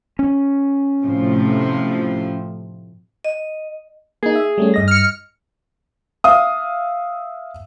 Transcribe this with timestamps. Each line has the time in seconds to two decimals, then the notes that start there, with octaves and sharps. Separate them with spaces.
0.19 C#4
1.03 A2 C3 F3
3.24 D#5
4.23 A#3 D#4 G#4
4.36 E5
4.58 G3 A3 C#4
4.74 G2 D#5 A#6
4.88 F6 C#7
6.24 E5 F5 D#6